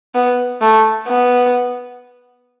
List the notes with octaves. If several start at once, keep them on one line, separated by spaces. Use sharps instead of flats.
B3
A3
B3